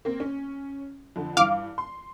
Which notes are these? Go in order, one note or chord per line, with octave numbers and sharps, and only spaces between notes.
A#3 C4
C#4
F2 D3
G2 E3 F5 D6
C6